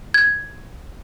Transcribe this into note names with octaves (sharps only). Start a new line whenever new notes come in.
G#6